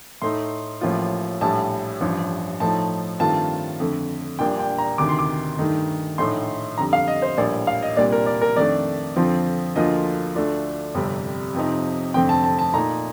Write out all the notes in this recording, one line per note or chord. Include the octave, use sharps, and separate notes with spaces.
A2 A3 D#4 C6
A1 A2 F3 A#3 F4
A#1 A2 G3 A5
A1 G2 F3
A2 F3 A3 D#4 A5
G2 D#3 A3 C4 F4 A5
F2 D3 A3
A#1 A#2 G3 A#3 D4 G5
G5
A#5
D2 C3 D#3 D6
C6
D6
G2 D#3 A3 D#4
A#1 A2 A3 D#4 C6
F2 D3 G3 A#5
F5
D#5
C5
A#1 A2 G3 A#3 D5
F5
D#5
C2 A#2 G3 A#3 D4 D5
A#4
D5
A#4
F2 D#3 A3 D4 D5
F2 D3 F3 C4 F4
D2 D3 F3 A#3 F4 D#5
D2 D3 A3 D4 F4
G1 F2 C3 G3
F2 C3 F3 C4 D#4
F1 F2 D3 A3 C4 G5
A5
A5
A5
A#2 A3 D#4 A#5